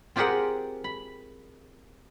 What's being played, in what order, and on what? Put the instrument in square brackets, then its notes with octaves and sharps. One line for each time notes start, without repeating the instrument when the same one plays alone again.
[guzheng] C4 F4 G4 G#4 A#4 F#5
B5